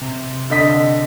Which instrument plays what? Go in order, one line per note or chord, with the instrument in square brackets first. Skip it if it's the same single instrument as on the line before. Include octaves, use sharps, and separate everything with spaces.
[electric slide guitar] C3
[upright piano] D3 D#5 B6